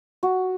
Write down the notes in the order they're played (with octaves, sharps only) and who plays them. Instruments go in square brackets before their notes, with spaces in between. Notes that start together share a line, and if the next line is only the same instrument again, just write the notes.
[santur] F#4